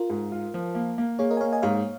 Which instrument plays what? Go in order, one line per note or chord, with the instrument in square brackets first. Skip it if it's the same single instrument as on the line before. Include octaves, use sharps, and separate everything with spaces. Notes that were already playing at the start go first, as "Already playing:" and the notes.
Already playing: [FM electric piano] F4 A#4
[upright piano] G#2
F4
F3
A#3
A#3
[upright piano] A#3 [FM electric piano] G#4 C#5
[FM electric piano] A#4 D#5
G#5
[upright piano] A#3 [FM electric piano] C#5 F5
[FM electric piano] D#5 G#5
[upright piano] G#2 [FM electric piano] C#5 F5